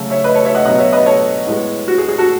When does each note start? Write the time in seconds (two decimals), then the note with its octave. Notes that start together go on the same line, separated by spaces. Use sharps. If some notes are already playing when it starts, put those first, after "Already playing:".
Already playing: C#3 F#3 A3
0.10 C#5 E5
0.24 B4 D#5
0.35 A4 C#5
0.45 C#5 E5
0.55 D#5 F#5
0.65 B2 F#3 B3 D#5 F#5
0.79 C#5 E5
0.93 B4 D#5
1.06 A4 C#5
1.47 A2 G#3 B3
1.88 F#4
1.98 G#4
2.08 G#4
2.18 F#4 A4